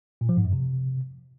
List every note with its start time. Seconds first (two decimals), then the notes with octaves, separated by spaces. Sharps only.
0.21 A#2
0.29 F3
0.37 G#2
0.45 F#2
0.53 C3